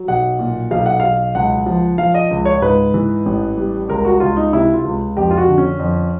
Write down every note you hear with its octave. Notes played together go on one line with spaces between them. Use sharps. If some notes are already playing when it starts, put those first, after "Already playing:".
Already playing: F#3
B1 F#5
A#2
B1 F5
F#5
B1 F5
C#2 F#5
F3
F3 F5
D#5
C#2
C#5
G#2 B4
E3
A1
G3
C#2 A#4
F#4
C#2 F4
D#4
C3 E4
F4
C#2
F2 G4
F4
F#4
D3
C#4
F2